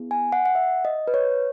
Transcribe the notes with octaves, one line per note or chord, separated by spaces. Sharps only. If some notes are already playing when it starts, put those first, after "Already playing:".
Already playing: B3 E4 G#4
G#5
F#5
F#5
E5
D#5
B4
C#5